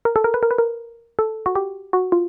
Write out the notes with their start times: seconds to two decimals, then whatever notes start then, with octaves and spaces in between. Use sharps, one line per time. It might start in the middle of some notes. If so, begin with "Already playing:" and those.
0.05 A#4
0.16 A4
0.24 A#4
0.34 B4
0.43 A#4
0.51 B4
0.58 A#4
1.19 A4
1.46 F#4
1.56 G4
1.93 F#4
2.12 F4